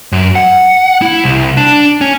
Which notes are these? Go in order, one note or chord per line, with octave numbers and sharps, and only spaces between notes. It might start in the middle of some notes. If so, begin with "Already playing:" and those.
F#2
F#5
E4
C2
D4
C#4